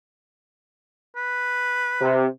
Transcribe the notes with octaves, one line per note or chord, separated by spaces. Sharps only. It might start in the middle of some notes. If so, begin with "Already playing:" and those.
B4
C3